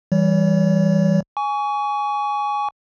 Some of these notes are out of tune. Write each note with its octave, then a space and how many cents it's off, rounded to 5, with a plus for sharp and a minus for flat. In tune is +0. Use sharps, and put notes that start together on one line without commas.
E3 +0 G3 +0 C#5 +40
G#5 +0 C#6 +30